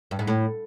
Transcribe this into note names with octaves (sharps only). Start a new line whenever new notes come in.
G2
G#2
A2